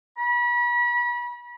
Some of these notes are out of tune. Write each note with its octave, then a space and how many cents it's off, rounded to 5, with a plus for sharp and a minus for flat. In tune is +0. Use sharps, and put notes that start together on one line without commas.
B5 -35